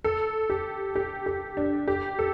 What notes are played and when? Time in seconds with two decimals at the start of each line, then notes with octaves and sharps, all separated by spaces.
0.04 A4
0.50 G4
0.95 G4
1.26 G4
1.57 D4
1.88 G4
2.19 A4